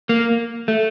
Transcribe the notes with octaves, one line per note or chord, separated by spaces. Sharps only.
A#3
A3